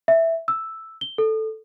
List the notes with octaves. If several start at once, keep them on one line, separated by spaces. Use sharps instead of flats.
E5
E6
G7
A4